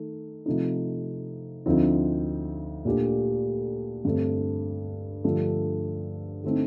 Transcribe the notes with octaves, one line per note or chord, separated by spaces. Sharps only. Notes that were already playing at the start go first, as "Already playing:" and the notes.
Already playing: D#3 A3
C3 F3 A3 D#4
D2 D3 F3 C4 D#4
A#2 A3 D4 G4
G2 D3 A3 C4
G2 D3 F3 A3
D3 A3 C4 D#4